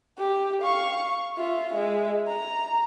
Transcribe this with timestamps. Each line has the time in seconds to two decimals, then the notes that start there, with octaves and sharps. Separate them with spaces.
0.18 G4
0.62 F5 C#6
1.38 F4 E5
1.72 G#3 E5
2.28 A#5